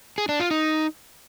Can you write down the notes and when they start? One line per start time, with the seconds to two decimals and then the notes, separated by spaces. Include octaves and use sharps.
0.18 G#4
0.29 D4
0.40 F4
0.51 D#4